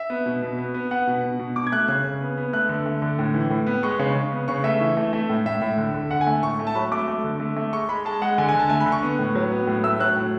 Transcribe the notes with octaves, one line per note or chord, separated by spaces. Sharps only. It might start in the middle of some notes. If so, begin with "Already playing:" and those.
Already playing: E5
B3
B2
B2
B3
B3
B3 F#5
B2
B2
B2
B2 D6
G#6
A3 F#6
C#3 F#6
C#3
B3
B3
A3 F#6
D3
A3
D3
A2
E3
A2
B3
G#3 C#6
C#3
C#3
B3
C#3 C#6
A3 E5
E3
A3
A3
A2
A2 E5
A2
D3
D3
D3 F#5
G#5
A3
A2 C#6
A3
A5
F#3 B5
A3 D6
A3
D3
A3
A3
G#3 C#6
G#3 B5
G#3 A5
G#3 F#5
D3 G#5
D3 G#5
A5
A3 G#5
B5
D3
C#6
B3
A2
F#3
B3
A2
A3 E6
F#3 F#6
A2